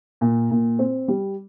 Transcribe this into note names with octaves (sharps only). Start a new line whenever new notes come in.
A#2
A#2
C4
G3